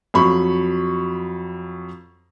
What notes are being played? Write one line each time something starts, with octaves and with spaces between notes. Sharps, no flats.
F2 F#3 B5 C#6